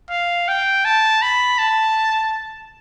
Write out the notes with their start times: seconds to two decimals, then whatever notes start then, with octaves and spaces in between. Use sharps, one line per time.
0.10 F5
0.48 G5
0.85 A5
1.22 B5
1.59 A5